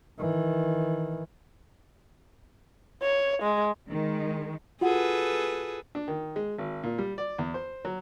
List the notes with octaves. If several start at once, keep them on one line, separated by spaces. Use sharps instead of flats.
D#3 E3
C#5
G#3
D#3 G#3
F4 F#4 G#4 A4 B4 F#5
D4
D#3
G#3
G#1
A#2
G3
D5
E2
C5
F#3